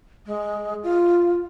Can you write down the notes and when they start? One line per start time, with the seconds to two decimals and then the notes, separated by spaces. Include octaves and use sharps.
0.26 G#3
0.83 F4